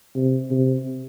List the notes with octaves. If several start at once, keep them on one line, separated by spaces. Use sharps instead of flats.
C3
C3